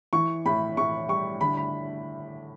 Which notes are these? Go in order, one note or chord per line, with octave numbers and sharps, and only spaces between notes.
E3 C#6
A2 B5
A2 C#6
G3 C#6
D3 B5
B5